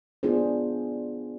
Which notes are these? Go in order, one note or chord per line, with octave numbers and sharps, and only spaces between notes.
B3 D4 F4 G#4 C5